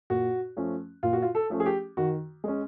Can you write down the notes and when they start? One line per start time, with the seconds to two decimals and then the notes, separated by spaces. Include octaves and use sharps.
0.10 A#2 F#4
0.57 F3 A3 C#4
1.03 A#2 F4
1.13 F#4
1.22 F4
1.35 A4
1.50 F3 A3 C#4
1.60 G#4
1.66 G4
1.97 D#3 F#4
2.44 G#3 C#4